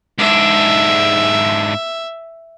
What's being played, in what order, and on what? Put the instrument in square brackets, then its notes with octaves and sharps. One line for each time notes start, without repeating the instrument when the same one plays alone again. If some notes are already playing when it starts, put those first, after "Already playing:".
[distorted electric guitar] G#2 D4 [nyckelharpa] E5